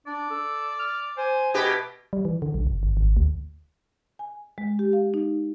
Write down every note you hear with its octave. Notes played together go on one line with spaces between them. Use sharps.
D4 D5
A4 E6
F6
C5 G#5
B2 G4 B4 D#5 G#6
G3
E3
D3
B1
F#1
G1
G#1
D2
G#5
G#3
G4
F5
D#4